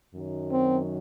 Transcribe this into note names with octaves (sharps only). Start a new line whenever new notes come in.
F#2 D#3 F#3
C4